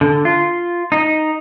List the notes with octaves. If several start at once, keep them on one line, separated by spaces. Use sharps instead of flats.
D3
F4
D#4